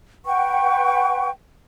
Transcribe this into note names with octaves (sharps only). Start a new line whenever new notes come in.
B4 F#5 G5 C#6